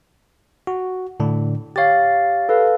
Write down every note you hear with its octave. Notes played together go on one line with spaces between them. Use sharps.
F#4
A2 D3 D4
G4 C#5 F5 A6
A4 B4 F5